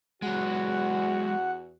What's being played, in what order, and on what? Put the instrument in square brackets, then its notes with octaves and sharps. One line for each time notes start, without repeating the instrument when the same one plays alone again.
[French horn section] E2 F#4 [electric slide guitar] F#3 G#3 [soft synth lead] F#5